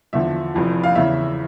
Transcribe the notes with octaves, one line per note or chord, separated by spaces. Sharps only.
E2 D3 F3 E5
F1 F2 E3
F5
E2 C#3 E3 E5